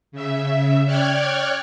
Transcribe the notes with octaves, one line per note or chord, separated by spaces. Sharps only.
C#3 E5
C#5 D5 G5 F6 F#6 G#6